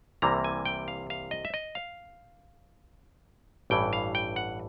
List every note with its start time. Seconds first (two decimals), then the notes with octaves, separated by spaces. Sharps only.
0.22 C2 C3 E3 G3 A#3 A#5
0.44 G#5
0.65 G5
0.88 F5
1.10 F5
1.31 D#5
1.45 E5
1.54 D#5
1.75 F5
3.70 A1 G2 E3 G5
3.93 F5
4.15 G5
4.36 F#5